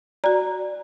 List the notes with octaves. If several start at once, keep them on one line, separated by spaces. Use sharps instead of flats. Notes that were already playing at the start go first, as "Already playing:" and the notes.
F#4 D5 A#5